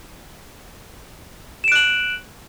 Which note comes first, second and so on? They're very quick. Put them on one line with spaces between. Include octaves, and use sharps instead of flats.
E7 D7 F#6 F#7